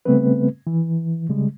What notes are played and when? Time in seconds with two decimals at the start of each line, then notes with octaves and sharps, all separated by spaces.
0.05 C#3 G3 A3 B3 C4 B4
0.67 E3
1.29 C#3 G3 G#3